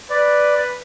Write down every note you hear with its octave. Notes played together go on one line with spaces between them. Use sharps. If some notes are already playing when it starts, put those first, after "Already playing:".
B4 D5